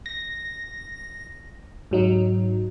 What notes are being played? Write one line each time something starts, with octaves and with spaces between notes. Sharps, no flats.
A#6
G#2 F#3 D#4